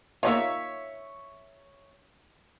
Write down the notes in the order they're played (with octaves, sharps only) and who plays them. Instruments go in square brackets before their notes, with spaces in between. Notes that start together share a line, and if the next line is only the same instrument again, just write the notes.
[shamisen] A#3 D#4 F4 [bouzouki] C#5 D5 E5